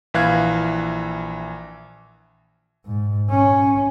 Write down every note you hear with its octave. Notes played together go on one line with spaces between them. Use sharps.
A#1 E3 F5 F#6 G#6
G#2
C#4